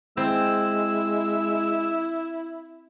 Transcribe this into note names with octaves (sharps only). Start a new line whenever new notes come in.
G#3 C4 E4 E6